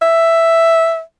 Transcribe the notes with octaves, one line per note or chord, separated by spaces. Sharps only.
E5